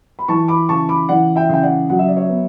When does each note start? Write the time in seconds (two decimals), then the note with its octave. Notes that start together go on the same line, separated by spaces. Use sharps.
0.19 B5
0.28 E3 A5 C#6
0.48 B5 D6
0.69 C#3 A5 C#6
0.89 B5 D6
1.09 E3 D5 F#5
1.36 E5 G5
1.49 C#3 G5
1.63 D5 F#5
1.90 F#3 F#5
1.99 E5
2.08 D5
2.17 C#5 E5
2.29 B3